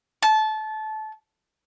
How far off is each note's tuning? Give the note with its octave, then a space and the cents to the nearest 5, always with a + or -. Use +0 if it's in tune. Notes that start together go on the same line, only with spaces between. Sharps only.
A5 -20